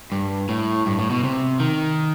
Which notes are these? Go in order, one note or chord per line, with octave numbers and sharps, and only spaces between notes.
G2
A2
G2
A2
B2
C3
D#3